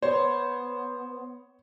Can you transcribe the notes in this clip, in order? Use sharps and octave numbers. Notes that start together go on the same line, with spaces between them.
B3 C5 C#5